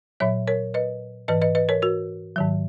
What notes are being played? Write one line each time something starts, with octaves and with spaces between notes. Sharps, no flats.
A#2 F#3 C#5 E5
A#4 C#5
B4 D#5
G#2 E3 B4 D#5
B4 D#5
B4 D#5
A#4 C#5
F#4 A#4
G#2 D#3 F#3